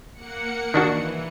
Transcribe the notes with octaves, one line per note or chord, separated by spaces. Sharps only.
A#3 F#5 C#7
D#3 E3 D4 F#4